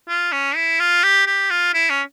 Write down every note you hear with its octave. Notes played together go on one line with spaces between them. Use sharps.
F4
C#4
E4
F4
G4
G4
F4
E4
C#4